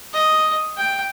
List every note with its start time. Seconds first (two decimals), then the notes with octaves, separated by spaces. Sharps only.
0.13 D#5
0.77 G5